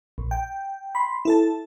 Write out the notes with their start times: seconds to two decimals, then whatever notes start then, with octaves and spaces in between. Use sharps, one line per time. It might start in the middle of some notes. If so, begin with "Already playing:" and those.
0.18 A#1
0.31 G5
0.95 B5 C6
1.25 E4 A4 A5